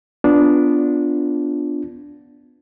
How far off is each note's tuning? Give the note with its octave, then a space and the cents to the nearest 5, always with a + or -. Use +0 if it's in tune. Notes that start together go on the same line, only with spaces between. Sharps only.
B3 +0 D4 -10 F4 +0